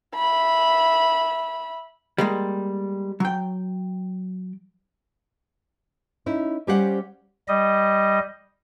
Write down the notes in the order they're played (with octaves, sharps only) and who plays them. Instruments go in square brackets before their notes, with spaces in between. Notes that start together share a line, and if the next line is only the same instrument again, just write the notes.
[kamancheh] E5 B5
[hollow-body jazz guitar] G3 G#3 A#3
F#3 G5
[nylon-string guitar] C#4 D#4 E4
G3 C#4 G4 C5 F5 F#5
[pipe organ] G3 D#5